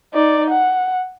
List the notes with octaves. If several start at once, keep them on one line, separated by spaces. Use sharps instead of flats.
D#4 D5
F#5